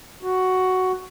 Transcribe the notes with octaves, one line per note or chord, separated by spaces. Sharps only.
F#4